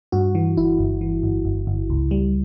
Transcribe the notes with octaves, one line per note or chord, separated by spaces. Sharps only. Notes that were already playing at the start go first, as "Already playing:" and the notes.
G2 F#4
E3
G1 E4
G1
E3
G1
G1
G1
C#2
G3